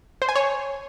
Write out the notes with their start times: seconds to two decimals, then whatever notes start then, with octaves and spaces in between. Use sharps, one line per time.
0.22 C5
0.29 G#5
0.36 C#5